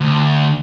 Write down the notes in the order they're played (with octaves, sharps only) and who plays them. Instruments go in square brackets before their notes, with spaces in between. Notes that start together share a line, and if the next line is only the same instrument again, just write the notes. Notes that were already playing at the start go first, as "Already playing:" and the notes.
[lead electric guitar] D2